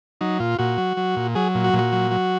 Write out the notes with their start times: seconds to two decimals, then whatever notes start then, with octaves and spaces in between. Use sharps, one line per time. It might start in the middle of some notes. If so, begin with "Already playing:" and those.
0.21 F#3 D#4
0.40 A#2 F4
0.59 A#2 F#4
0.78 F#3
0.97 F#3
1.16 A#2
1.35 F#3 G#4
1.55 A#2
1.64 F#4
1.74 A#2
1.79 F#4
1.92 F#3
2.11 F#3